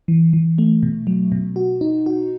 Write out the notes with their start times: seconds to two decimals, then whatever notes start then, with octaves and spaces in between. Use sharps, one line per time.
0.08 E3
0.33 E3
0.58 A3
0.83 B2
1.07 F#3
1.32 B2
1.56 F#4
1.81 D#4
2.06 F#4